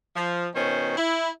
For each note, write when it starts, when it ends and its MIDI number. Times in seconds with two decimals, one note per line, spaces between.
0.16 0.48 53
0.55 0.95 47
0.55 0.95 51
0.55 0.95 61
0.55 0.95 72
0.97 1.29 64